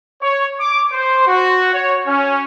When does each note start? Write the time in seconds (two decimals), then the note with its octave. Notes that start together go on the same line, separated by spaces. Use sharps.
0.21 C#5
0.60 D6
0.92 C5
1.27 F#4
1.74 C#5
2.07 C#4